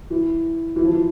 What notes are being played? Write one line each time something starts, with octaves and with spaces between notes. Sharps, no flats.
E3
E3
F3
E3